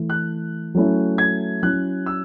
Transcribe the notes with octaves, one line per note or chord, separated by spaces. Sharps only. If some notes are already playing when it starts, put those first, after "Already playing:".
Already playing: E3 A3 E4
F#6
F#3 A3 C#4 E4
G#6
F#3 C#4 E4 F#6
E6